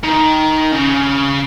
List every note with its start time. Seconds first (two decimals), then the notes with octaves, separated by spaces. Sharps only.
0.03 D#3
0.72 C#3